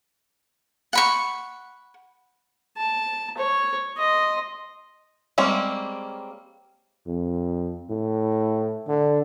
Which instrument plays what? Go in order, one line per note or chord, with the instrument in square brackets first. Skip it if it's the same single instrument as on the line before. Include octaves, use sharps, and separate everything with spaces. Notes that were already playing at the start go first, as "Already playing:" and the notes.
[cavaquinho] F#5 B5 C#6
[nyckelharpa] A5
C#5
D#5 C6
[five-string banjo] G3 G#3 A#3 C4 C#4
[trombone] F2
A2
D3